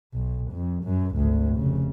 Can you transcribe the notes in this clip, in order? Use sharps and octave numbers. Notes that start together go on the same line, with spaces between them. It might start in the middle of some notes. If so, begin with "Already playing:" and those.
B1
F2
F#2
G#1 D2
F1 C#3